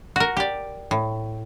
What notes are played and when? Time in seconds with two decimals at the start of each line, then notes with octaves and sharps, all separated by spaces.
0.16 F#4 A#4
0.37 G4 D5
0.91 A2